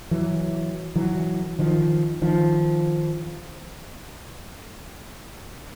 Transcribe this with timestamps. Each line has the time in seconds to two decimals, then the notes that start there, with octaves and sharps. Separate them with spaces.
0.11 E3 F#3
0.96 E3 F#3
1.59 D#3 F3
2.22 D#3 F3